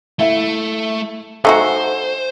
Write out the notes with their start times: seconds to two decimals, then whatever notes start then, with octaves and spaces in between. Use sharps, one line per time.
0.19 A3 E4 E5
1.45 A3 D#4 F#4 C5 G#5